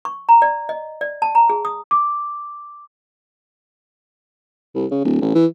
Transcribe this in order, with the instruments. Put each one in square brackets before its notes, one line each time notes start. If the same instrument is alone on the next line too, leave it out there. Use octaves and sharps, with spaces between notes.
[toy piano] C#6
A#5
D5
D#5
D5
A5
A#5
G#4
D#6
[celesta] D6
[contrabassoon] C2
C#3
D1
A1
E3